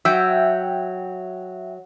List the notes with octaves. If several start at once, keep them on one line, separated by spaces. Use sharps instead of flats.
F#3 E5 G5